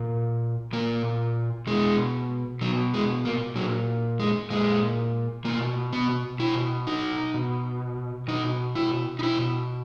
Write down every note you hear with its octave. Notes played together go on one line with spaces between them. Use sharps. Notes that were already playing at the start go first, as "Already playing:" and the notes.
Already playing: A#2
A#2 A#3
B2 G#3
B2 F#3
G#3
A#3
A#2 F#3
G#3
A#2 G#3
B2 A#3
B3
B2 E4
D#4
B2
B2 D#4
E4
D#4
B2 E4